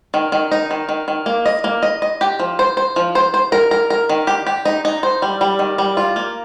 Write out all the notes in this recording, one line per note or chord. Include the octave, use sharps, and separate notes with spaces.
D#3
D#3
D#4
D#3
D#3
D#3
A#3
D#5
A#3
D#5
D#5
G4
F3
C5
C5
F3
C5
C5
A#4
A#4
A#4
D#3
G4
G4
D#4
D#4
C5
G3
G3
D#3
G3
F4
A#3